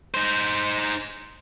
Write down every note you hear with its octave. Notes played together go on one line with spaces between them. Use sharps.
D#4 C5